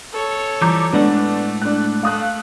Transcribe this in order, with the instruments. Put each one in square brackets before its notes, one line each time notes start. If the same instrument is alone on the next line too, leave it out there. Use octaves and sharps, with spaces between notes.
[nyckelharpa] A4 C#5
[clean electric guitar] E3 F3 G3 [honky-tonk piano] A#5 D6 G6
[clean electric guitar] A2 G#3 F#5 [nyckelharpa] A3 [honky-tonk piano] B3 D4
[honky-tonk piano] D4 F#6
[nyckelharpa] A3 [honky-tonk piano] F5 D#6 F#6